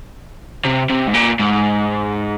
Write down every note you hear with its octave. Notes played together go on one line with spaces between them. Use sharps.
C3
C3
G#2
A#2
G#2